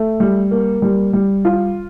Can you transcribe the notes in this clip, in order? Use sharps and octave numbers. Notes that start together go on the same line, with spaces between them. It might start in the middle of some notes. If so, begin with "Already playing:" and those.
Already playing: A3
G3
A#3
G3
G3
F4